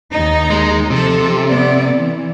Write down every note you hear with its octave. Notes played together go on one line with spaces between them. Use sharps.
D#2 D#4
G#3
C3 F3 A4
B3 D5
E3